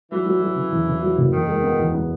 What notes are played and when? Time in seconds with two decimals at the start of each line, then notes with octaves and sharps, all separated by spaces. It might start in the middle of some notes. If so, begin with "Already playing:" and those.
0.11 E3 F#3
0.26 F#3
0.41 F#3
0.56 C#3
0.72 E2
0.88 C#3
1.02 F#3
1.18 F#1
1.32 E2 D#3
1.48 G#3
1.64 B3
1.79 E2
1.94 B3